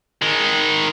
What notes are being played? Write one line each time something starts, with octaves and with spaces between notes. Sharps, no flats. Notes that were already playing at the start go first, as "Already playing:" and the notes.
D#3 G#3